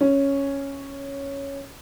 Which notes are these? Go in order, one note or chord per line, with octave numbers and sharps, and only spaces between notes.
C#4